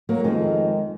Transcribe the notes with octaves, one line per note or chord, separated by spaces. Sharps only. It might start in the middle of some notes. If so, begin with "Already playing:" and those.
F#3 A#3
F2 D#3 G#3